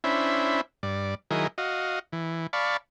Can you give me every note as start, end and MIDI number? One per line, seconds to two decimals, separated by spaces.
0.04 0.61 61
0.04 0.61 62
0.04 0.61 64
0.04 0.61 72
0.04 0.61 76
0.04 0.61 83
0.83 1.15 43
0.83 1.15 74
1.31 1.47 51
1.31 1.47 54
1.31 1.47 64
1.31 1.47 68
1.31 1.47 70
1.31 1.47 75
1.58 1.99 66
1.58 1.99 75
1.58 1.99 77
2.12 2.47 52
2.53 2.77 74
2.53 2.77 77
2.53 2.77 81
2.53 2.77 83
2.53 2.77 85